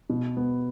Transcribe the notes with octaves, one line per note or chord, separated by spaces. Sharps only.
B2
B3